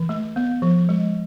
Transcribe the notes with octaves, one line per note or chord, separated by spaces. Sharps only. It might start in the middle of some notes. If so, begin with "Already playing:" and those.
Already playing: E3
A3
B3
F3
G#3